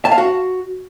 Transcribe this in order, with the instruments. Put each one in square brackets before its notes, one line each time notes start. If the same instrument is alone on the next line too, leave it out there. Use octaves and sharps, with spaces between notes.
[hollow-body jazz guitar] A5
F5
F#4